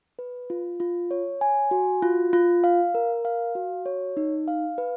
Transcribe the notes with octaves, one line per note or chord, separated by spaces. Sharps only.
B4
F4
F4
C#5
G#5
F#4
F4
F4
F5
A#4
F5
F#4
C#5
D#4
F5
B4